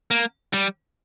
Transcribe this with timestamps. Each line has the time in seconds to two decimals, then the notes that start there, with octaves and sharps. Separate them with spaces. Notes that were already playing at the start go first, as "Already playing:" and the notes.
0.11 A#3
0.53 G3